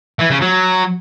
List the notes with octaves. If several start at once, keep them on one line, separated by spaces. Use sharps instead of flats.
E3
C#3
F#3